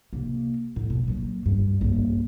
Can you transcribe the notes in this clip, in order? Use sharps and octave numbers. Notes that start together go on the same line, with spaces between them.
C3 A#3
A2
B2
A#2 F#3
G2
A#1 G2